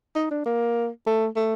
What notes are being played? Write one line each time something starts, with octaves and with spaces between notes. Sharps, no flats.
D#4
D4
A#3
A3
A3